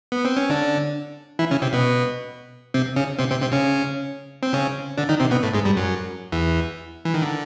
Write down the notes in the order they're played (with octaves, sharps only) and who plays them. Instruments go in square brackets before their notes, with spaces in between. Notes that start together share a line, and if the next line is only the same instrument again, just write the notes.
[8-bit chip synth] B3
C4
C#4
D3 D4
E3 E4
C#3 C#4
C3 C4
B2 B3
C3 C4
C#3 C#4
C3 C4
C3 C4
C3 C4
C#3 C#4
C4
C#3 C#4
D3 D4
D#3 D#4
C3 C4
B2 B3
A2 A3
G#2 G#3
G2 G3
F#2 F#3
E2 E3
E3
D#3
D3